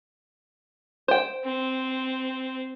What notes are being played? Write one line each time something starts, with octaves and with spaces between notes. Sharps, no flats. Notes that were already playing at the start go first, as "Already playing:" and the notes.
C5 G5
C4